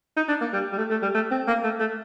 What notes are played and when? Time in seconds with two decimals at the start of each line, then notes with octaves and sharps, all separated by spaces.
0.17 D#4
0.29 D4
0.41 A#3
0.53 G3
0.73 G3
0.78 A3
0.90 A3
1.02 G3
1.14 A3
1.31 C4
1.48 A#3
1.64 A3
1.80 A3